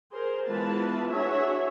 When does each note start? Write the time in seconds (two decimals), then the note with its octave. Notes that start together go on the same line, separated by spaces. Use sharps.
0.13 G#4 A#4 C5
0.48 E3 G#3 B3 F4 B4 A5
1.11 D4 F#4 G#4 C#5 E5